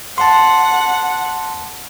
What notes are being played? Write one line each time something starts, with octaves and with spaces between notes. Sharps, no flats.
F#5 A5 C6